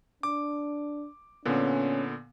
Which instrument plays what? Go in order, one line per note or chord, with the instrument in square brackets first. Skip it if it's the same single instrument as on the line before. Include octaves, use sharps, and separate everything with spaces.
[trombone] D4 [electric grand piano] D6
[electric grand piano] A#2 D3 B3 [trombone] C#4